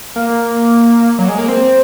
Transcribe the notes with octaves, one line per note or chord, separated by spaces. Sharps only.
A#3
F#3
G#3
A#3
C4